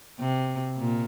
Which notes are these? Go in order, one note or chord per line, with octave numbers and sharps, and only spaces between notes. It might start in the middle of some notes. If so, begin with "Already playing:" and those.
C3
A#2